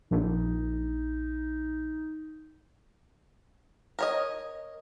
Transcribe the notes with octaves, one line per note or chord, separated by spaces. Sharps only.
A#1 D#4
A#4 C#5 D#5